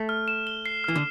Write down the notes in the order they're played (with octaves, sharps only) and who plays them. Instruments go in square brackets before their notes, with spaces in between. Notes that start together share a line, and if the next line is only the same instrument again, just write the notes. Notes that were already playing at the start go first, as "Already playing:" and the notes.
Already playing: [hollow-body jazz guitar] A3
[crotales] F6
E7
G7
C7
[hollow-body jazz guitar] E3 [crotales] F6
[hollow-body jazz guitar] D3